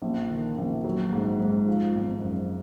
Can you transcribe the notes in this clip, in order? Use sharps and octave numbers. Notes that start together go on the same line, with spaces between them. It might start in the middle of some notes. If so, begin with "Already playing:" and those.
A#1
D#3
A#1
F#3
G#2
G#2
F3
G#1
F#2